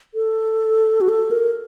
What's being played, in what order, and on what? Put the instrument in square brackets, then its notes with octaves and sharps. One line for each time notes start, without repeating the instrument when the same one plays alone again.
[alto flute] A4
F#4
A4
A#4